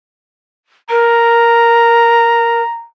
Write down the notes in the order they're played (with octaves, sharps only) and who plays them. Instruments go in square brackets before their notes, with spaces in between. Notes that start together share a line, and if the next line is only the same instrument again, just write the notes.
[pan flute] A#4 [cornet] A#5